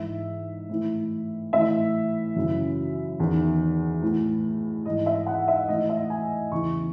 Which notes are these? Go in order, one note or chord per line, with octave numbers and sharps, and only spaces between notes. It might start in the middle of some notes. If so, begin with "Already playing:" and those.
Already playing: G#2 E3 E5
A2 E3
A2 E3 E5
F#2 C#3 E3
E2 D#3
A2 E3
G#2 E3 D#5
E5
F#5
E5
A2 E3 D#5
E5
G#5
E2 C#3 E3 C#6